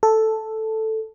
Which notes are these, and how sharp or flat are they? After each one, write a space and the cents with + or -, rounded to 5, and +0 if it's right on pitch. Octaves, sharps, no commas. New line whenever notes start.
A4 +0